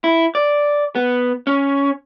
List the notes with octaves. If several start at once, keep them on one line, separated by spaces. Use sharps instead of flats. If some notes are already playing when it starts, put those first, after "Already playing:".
E4
D5
B3
C#4